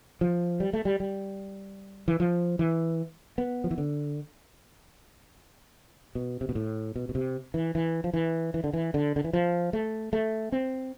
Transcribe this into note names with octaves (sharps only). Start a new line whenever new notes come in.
F3
G3
A3
G3
G3
E3
F3
E3
B3
F3
E3
D3
B2
C3
B2
A2
B2
B2
C3
E3
E3
F3
E3
E3
D3
E3
D3
D3
E3
F3
A3
A3
C4